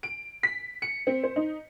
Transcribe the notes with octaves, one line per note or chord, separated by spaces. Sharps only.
D7
B6
C#7
C4
C5
D#4